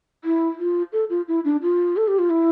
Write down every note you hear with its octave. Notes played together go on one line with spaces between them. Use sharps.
E4
F4
A4
F4
E4
D4
F4
A4
G4
F4
E4